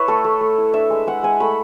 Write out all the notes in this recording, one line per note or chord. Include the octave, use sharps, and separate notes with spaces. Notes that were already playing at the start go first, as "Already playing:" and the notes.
Already playing: E4 B4 C#5 E5
A3 A4
A3
A3
E4
D4 E5
G#3
G#3 F#5
G#3 G#5
A3 B5